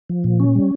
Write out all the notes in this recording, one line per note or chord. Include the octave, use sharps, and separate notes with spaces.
F3
A#2
C#4
G3